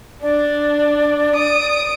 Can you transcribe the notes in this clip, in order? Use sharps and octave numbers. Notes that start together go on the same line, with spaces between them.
D4 D5
D#6 D7